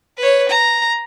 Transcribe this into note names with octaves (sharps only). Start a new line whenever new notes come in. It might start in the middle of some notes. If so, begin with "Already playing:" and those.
B4 C#5
A#5